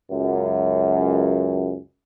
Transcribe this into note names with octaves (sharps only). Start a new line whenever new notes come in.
C#2 F#2